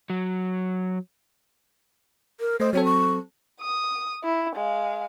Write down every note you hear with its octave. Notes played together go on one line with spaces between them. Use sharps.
F#3
A#4
A3 C5 D#5
F#3 C4 A4 C#5
C#6
D#6
E4
G#3 F5